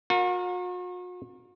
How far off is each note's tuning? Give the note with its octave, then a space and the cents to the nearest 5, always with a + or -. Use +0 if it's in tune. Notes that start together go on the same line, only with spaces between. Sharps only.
F#4 -45 A#4 +0